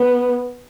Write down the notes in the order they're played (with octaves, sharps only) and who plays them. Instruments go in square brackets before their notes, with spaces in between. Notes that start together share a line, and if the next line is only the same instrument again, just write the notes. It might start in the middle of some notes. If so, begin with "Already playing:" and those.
Already playing: [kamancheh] B3